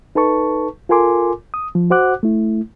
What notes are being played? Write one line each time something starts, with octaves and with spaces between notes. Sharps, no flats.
D#4 A4 B4 A5 C#6
F4 A4 A#4 G#5 C6 D6
D#6
F3
F#4 C5 F#5 D6 F#6
A3 E4